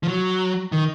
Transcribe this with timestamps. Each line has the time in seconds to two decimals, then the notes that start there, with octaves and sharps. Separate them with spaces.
0.03 F3
0.08 F#3
0.72 D#3